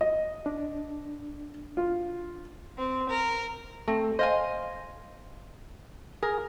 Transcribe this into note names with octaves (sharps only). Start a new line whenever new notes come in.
D#5
D4
F4
C4
A#4
A3 C4
C5 D#5 F5 G#5
G#4 A#4